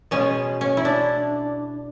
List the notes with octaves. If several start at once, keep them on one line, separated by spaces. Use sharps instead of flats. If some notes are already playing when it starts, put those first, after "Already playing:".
B2 G#3 B3 C#4
C#4
E4
D4